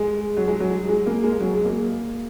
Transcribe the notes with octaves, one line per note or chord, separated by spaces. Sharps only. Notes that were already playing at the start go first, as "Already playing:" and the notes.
Already playing: G#3
F#3
G#3
F#3
G#3
G#3
A#3
G#3
F#3
G#3
A#3